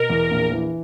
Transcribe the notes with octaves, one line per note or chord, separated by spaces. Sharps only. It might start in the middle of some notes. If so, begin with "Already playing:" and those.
Already playing: B2 A#4
E2
A#1
E3